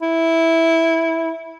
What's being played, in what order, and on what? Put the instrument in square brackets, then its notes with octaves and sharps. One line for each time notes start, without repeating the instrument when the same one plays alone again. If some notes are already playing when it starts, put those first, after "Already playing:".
[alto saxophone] E4